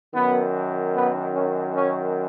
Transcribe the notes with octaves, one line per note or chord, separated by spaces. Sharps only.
F#2 D#3 B3
B3
C#4
C#4